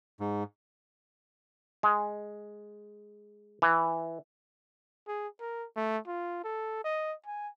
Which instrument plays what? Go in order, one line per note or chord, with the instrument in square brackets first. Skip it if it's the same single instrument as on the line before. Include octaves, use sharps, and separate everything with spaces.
[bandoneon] G#2
[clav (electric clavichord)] G#3
E3
[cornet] G#4
A#4
A3
F4
A4
D#5
G#5